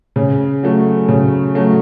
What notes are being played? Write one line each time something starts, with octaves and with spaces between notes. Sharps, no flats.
C#3
F#3 A3
C#3
F#3 A3